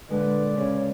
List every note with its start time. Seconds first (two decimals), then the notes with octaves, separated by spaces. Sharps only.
0.10 A#2 D3 G#3 B4 D5
0.57 C#3 C#4 C#5